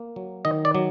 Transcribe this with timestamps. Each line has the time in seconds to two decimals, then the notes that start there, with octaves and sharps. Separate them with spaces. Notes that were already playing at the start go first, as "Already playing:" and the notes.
Already playing: A#3
0.16 F#3
0.45 D#3 D#5
0.65 D5
0.75 F#3